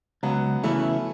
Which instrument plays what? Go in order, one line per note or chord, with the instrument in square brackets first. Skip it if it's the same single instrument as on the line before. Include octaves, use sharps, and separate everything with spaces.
[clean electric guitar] C#2 [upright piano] F#3 B3
[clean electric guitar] C#3 E3 B3 E4 [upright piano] A3 C#4